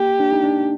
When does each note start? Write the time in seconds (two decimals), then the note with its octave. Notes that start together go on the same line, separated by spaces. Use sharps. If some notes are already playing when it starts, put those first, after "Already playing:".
Already playing: A#3 G4
0.20 D4
0.32 D#4
0.44 D4